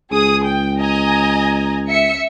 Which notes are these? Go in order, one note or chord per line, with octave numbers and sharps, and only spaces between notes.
C#2 G#4 D#6
G5
D#5 G#5 A#5
E5 C#7